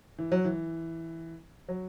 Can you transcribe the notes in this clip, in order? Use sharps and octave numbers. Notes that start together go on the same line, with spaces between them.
E3
F#3
E3
F#3